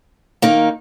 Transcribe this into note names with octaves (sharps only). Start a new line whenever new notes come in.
D#3 A#3 D#4